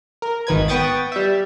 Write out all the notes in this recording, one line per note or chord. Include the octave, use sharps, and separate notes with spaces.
A#4
G#1 D#3 B4 G#6
B3 B4 G5 C#6 D#6 A6
G3 E5